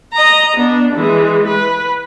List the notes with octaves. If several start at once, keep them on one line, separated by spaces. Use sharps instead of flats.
D#5 A#5
B3 D4
E3 G#3
B4